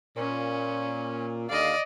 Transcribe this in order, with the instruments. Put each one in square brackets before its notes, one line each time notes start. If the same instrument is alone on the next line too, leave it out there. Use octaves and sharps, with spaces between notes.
[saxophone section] A#2 [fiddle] C#4
[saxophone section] D#2 D3 F5 [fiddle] D5 D#5